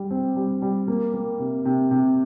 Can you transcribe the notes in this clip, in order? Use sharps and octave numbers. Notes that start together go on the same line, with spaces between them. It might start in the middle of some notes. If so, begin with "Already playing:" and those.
Already playing: G3
C4
G3
G3
A#3
A#3
C3
C3
C3